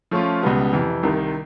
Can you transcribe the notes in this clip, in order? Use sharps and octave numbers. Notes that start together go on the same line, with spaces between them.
F3 A3 C#4 F4
C#2 B2 G3 B3
F2 C3 E3
C2 C3 D#3